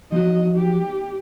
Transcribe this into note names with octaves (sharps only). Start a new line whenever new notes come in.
F3 F#3 F#4 D#5
G4